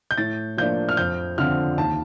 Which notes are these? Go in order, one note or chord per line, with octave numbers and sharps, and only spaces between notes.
G6
A2 A6
F3 A#3 D4 G6
F6
F2 G6
D3 F3 C4 F6
D#2 A5